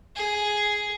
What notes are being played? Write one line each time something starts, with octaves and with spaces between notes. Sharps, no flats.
G#4